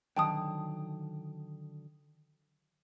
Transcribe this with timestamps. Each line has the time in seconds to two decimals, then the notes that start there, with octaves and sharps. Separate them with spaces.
0.17 D3 D#3 F#3 G5 A5 D#6